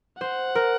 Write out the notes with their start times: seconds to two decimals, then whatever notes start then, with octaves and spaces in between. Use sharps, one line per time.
0.21 C5 F#5
0.55 A#4